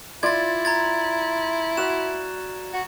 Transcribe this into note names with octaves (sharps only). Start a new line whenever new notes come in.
E4 F4 D5 C6 G#6 A6
A#5 G#6 A6
F#4 F5 E7
F#4